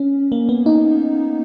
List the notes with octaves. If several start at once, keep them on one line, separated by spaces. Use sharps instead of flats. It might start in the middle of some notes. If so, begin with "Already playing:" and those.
Already playing: C#4
A#3
B3
D#4